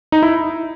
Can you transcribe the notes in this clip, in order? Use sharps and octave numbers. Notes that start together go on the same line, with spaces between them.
D#4
E4